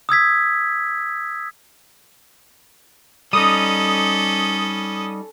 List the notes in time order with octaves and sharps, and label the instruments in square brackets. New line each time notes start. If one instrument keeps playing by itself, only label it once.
[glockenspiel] D#6 E6 G#6 B6
[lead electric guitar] G3 D#4 [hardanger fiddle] C#4 A4 [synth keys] D#6